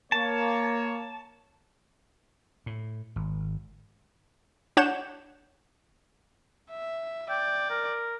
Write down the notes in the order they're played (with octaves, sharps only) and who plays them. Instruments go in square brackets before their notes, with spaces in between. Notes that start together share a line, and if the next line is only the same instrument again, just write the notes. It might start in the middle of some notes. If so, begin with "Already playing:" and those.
[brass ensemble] A#3 C#5 [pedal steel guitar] A5
[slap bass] A2
G#1
[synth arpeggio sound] D4 C#5 F#5 G6 E7
[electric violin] E5
[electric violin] D5 [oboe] G5
[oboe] A#4